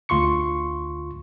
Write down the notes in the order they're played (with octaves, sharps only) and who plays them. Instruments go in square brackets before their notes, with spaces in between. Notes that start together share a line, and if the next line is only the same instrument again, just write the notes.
[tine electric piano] D2 F4 C6 C#6 C#7